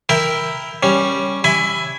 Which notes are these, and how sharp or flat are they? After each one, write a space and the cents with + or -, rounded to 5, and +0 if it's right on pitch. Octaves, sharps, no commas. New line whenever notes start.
E4 +0 A#4 +0 G5 +20
G3 +0 C#4 +0
E4 +0 G#5 +0 B5 +30